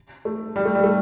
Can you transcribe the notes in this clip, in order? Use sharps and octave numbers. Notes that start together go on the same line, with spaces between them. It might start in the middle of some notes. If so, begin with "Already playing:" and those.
A3
G3
A3
G3
A3